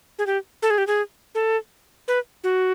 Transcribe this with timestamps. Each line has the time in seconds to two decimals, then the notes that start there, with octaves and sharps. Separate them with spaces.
0.19 G#4
0.27 G4
0.62 A4
0.70 G#4
0.78 G4
0.87 G#4
1.35 A4
2.08 B4
2.44 F#4